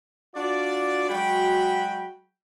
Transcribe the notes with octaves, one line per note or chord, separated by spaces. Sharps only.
D4 F4 F#4 D5
F#3 G#3 F#4 G5 B5